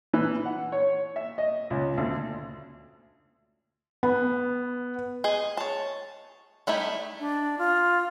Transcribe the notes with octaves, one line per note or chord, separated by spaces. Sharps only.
E3
F#5
C#5
E5
D#5
C#2
D2
B3
G#4 D#5
C#5 A5
G3 A3 D#4 E4
D4
F4